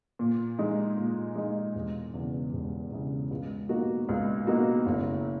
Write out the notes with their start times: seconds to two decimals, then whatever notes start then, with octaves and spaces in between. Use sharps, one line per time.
0.19 A#2
0.59 G#3 D#4
0.97 A#2
1.36 G#3 D#4
1.75 E1
2.14 E2 C#3
2.53 E1
2.92 E2 C#3
3.31 C#2
3.69 B2 A#3 D#4 F#4
4.09 C#2
4.47 B2 A#3 D#4 F#4
4.86 F#1